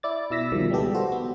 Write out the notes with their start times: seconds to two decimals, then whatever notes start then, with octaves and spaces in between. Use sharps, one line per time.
0.03 E4 D5 A6
0.30 B2 E4 E6 A#6 B6
0.52 C#2 B2 D#3 F3 G3
0.71 G3 G#3 B3 G4 A4
0.94 F#4 C5
1.12 B3